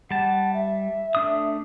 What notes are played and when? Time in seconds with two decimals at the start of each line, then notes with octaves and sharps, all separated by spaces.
0.11 G3 F#5 A5
0.54 E5
1.15 A3 D4 D#6